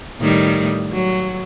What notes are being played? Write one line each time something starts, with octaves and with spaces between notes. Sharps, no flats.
A2 D#3 G3
F#3